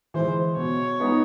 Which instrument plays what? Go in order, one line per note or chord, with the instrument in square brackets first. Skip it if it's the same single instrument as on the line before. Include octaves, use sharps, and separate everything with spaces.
[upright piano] E3 G#3 [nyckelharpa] C5
[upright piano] B2 [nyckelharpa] C#5
[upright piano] G#3 B3 D#4 G#4